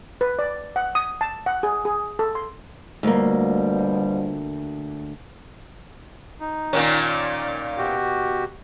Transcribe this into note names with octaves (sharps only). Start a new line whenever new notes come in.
B4
D5
F#5
D#6
A5
F#5
G#4
G#4
A4
C6
D2 B2 F3 G3 A#3
D#4
A#2 D#3 C#4
D5
B2 F#4 G4